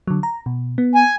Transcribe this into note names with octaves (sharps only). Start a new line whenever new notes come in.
D3 F#3
A#5
B2
B3
G#5